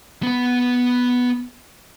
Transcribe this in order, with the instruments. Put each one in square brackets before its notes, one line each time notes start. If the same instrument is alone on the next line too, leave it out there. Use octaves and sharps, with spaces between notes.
[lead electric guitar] B3 B4